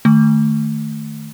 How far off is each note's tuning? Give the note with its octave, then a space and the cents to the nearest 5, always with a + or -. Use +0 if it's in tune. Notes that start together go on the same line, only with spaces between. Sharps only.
D#3 -30 A3 +0